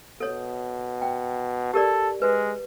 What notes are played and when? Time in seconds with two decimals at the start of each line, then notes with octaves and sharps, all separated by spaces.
0.20 B2 A4 C#5
1.02 G5
1.74 G4 A4 A#4 D5
2.22 G#3 B4